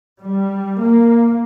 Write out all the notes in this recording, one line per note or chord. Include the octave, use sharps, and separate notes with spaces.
G3
A#3